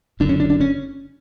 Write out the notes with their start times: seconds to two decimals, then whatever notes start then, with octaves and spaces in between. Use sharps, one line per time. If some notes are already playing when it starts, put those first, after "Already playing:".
0.20 F#1 F#2 D3 D4
0.29 C#4
0.40 D4
0.50 D4
0.60 C#4